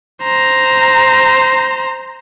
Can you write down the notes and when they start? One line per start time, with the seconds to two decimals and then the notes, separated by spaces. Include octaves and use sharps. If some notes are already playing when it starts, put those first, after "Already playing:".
0.23 C5 A#5